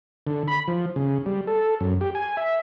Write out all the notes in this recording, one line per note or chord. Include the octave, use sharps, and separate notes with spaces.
D3
B5
F3
C#3
G3
A4
F#2
G4
G#5
E5